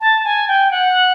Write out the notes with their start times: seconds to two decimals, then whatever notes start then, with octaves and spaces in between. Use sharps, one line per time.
0.01 A5
0.24 G#5
0.48 G5
0.71 F#5